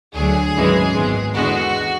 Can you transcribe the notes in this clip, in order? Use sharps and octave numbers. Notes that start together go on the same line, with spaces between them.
D2 D3 F#3 G#4
G#1 F#2 E3 G#3
G#1 G#2 G#3 B3
E2 D3 G#3 B3 F#4